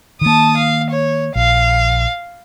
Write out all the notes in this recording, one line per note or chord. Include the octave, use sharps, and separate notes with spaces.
D#3 A#3 A5 D#6
F5
C#5
A#1 F5